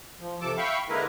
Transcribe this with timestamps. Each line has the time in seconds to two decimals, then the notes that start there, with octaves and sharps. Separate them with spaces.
0.20 F3
0.41 C3 F3 A4 A5 D6
0.58 E5 F5 G5 B5 C#6
0.89 D3 G#3 A#3 E4 A#4 B4